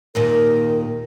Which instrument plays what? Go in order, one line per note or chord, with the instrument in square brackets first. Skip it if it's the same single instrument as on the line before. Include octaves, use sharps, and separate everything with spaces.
[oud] D#2 A#2 D#3 [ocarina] A#4